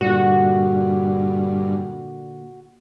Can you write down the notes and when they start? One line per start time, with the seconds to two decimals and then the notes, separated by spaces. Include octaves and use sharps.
0.01 G2 A#2 D3 F#4